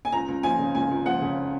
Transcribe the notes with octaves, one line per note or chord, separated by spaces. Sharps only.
G#5
C#2 A#5
C#2
F3 G#5
C#3
C#2 G#5
C#2
F3 F#5
C#3